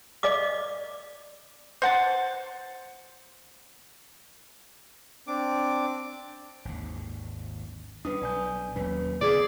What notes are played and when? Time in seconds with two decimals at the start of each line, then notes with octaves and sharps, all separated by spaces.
0.23 D5 D#5 F5 D6
1.82 C5 F#5 A5
5.27 C4 D4 D6
6.65 G#1 D#2
8.05 G3 C#4 D4 B4 D#6
8.21 B1 D5 G#5 G6
8.76 D#2 F#3 A#3 C#4 B4
9.21 C#3 A3 B3 F4 G#4 D5 G#6